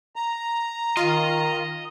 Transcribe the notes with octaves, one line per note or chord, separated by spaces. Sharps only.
A#5
D#3 F4 D#5